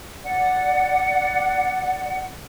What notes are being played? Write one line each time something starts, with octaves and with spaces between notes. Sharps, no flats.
D5 F#5